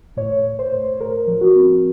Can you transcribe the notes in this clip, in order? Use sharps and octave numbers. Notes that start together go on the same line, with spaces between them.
A2 C#5
A2
C5
A2
A2 A#4
F3
F#4
C4